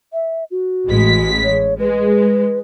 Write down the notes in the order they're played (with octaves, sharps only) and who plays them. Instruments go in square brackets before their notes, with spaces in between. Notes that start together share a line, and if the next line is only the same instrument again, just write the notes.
[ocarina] E5
F#4
[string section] A1 G#3 B6
[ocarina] C#5
[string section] G#3 [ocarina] B4